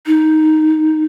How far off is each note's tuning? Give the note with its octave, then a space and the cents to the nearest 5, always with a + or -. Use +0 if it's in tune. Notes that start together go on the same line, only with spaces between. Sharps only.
D#4 +5